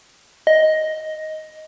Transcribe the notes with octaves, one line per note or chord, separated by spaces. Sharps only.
D#5